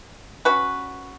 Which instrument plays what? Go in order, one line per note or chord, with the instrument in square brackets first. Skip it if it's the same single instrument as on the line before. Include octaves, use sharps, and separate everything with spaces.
[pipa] C#4 F#4 B4